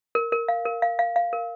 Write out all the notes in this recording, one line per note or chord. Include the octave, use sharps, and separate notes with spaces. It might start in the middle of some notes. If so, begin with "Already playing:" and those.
A#4
A#4
F5
A#4
F5
F5
F5
A#4